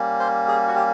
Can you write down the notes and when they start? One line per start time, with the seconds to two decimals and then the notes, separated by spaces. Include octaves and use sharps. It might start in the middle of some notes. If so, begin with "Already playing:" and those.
Already playing: G3 A#3 C#4
0.19 C5
0.48 G#4
0.68 F#4
0.76 G4